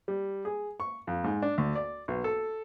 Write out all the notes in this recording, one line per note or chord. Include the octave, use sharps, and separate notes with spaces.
G3
G#4
C#6
F2
G#2
D4
D2
D5
B1
A4